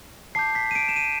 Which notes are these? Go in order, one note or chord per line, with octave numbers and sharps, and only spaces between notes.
A5 D6 G6 C7
B6
D#7
D7
E7
D#7